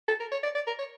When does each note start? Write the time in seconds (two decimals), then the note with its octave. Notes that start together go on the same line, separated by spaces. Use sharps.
0.08 A4
0.20 A#4
0.32 C#5
0.43 D5
0.55 D5
0.67 A#4
0.79 C#5